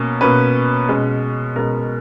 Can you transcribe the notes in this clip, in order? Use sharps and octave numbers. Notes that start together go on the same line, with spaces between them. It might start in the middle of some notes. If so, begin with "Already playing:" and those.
Already playing: B2 A#3 C#4
B2 A#3 C#4 B4
B2 G#3 C#4
B2 G#3 C#4 A#4